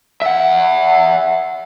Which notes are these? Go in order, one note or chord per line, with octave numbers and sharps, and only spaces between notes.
E5 F#5